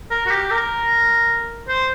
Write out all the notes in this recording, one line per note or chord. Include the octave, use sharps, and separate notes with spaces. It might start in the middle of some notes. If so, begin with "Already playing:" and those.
A#4
F#4
G4
A#4
C5